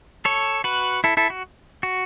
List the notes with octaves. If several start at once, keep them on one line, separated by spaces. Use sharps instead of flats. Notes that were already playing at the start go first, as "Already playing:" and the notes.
A4 C#5
F#4 B4
E4 A4
E4 A4
F#4
F#4